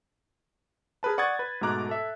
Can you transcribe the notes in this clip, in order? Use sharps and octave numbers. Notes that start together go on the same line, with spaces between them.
G#4 A#4 B4 A5
D5 F#5 C#6 D#6 G#6 A6
B4
G#2 B2 A3 A#5 D6 F#6
A4 E5